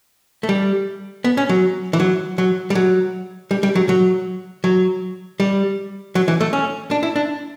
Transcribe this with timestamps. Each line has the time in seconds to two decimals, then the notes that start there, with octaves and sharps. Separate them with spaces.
0.43 A3
0.49 G3
1.24 B3
1.37 C#4
1.49 F#3
1.93 E3
2.00 F#3
2.38 F#3
2.70 G3
2.75 F#3
3.51 G3
3.63 G3
3.75 F#3
3.89 F#3
4.64 F#3
5.40 G3
6.15 F#3
6.28 E3
6.41 A3
6.53 C#4
6.91 D4
7.03 E4
7.16 D4